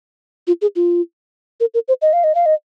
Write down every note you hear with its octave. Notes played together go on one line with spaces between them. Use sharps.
F4
G#4
F4
A#4
A#4
C5
D#5
F5
D#5
F5
D#5